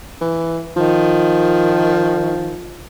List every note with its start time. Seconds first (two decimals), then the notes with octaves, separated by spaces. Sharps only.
0.21 E3
0.76 D#3 F3